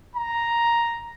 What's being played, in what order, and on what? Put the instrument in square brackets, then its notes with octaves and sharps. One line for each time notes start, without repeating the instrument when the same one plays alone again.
[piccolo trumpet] A#5